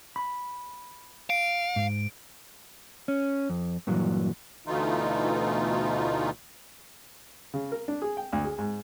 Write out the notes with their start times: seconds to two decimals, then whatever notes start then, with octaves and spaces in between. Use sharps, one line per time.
0.16 B5
1.30 F5 D7
1.76 G#2
3.08 C#4
3.50 F2
3.87 G2 A#2 E3 F#3
4.67 D2 B2 E3 A3 D#4 F4
7.54 C#3
7.72 A#4
7.88 D4
8.02 G#4
8.17 G5
8.33 D2
8.45 G#4
8.59 G#2